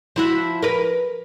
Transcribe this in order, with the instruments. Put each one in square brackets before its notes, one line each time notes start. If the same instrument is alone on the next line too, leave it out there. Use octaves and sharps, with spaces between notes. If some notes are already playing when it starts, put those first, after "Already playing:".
[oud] F3 E4 F#4
A#4 B4